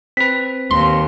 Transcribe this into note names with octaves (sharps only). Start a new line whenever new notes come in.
C4 B4 B6
D#2 C6